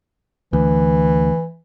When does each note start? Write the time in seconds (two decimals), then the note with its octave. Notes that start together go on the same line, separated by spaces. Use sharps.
0.53 D2 E3